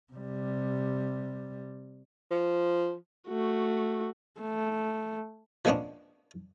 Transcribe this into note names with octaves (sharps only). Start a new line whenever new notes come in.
C3 G3
F3
A3 F#4
A3
F3 G#3 A#3 B3 C#4 D4